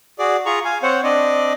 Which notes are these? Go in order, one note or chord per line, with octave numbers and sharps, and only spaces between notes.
F#4 G#4 D5
F4 G#4 A#5 C#6
F5 G#5
C4 C5 C#5 F#5
C4 D4 D5 D#5